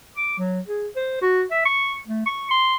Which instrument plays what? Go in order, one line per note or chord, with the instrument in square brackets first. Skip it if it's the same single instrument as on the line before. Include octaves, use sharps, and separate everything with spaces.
[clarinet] D6
F#3
G#4
C5
F#4
E5
C#6
A3
C#6
C6